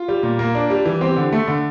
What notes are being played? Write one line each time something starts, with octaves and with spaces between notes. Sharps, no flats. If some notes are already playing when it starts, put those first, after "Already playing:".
Already playing: F4
G3
A#2
A#3
D4
G3
E3
C4 G4
D3
A3
D3